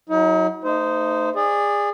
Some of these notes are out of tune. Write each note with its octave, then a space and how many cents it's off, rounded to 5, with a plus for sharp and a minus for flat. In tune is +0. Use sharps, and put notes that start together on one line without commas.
F#3 +0 D#4 +45
A3 +30 D#4 -5 C5 -20
G#4 -20 D5 +0